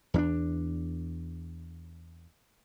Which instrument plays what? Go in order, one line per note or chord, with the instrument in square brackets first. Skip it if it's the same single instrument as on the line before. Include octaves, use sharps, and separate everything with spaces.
[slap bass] E2 C#4 D4